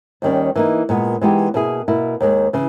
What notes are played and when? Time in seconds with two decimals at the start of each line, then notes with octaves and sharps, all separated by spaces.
0.22 D#2 D#3 G3 C#4
0.56 E3 A#3 D#4
0.89 A#2 G#3 B3
1.21 E3 G#3 B3 D#4 G4
1.54 B2 A#3 E4 G#4
1.88 B2 A#3 E4
2.20 D#2 D#3 G#3
2.53 C#3 E3